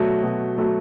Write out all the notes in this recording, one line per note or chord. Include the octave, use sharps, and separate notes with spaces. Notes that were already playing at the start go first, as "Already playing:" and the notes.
Already playing: B2 F#3 A3
B2
F#3 A3